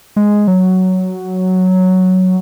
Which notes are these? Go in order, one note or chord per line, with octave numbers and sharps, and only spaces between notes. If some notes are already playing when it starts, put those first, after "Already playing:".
G#3
F#3